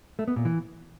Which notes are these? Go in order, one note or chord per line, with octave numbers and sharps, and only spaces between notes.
A3
B3
A#2
E3